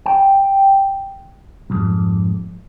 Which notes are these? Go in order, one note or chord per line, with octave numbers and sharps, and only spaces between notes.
G5
B1 F2 G#2